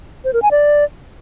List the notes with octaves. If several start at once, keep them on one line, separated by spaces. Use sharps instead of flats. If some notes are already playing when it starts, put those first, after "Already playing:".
C5
A#4
G#5
D5